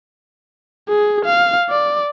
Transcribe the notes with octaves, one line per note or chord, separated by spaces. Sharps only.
G#4
F5
D5